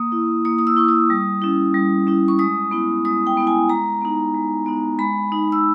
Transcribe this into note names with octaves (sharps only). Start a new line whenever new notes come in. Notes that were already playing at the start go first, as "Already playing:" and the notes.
Already playing: A#3 D#6
E4
A#3 D#6
D#6
E6
E4 C#6
D#6
G3
C#4 E4
G3
C#4 E4
C#6
G#3 D#6
B3 E4
G#3 D#6
G5
B3 E4
G#5
G#3 A#5
B3 D#4
G#3
B3 D#4
G#3 B5
D#4
E6